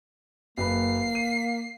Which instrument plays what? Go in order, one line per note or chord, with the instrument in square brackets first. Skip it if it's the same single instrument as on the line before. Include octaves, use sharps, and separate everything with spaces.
[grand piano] F#1 B4 B5 [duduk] A#3 [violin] C7
[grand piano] D#7